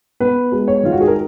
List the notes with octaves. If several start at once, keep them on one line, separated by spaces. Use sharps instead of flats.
B3 B4
G#3
C#5
D#3 F4
F#4
G#4
A#4